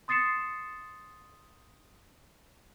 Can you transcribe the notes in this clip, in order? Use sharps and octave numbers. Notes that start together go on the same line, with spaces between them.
C6 D#6 A6 C7 C#7 E7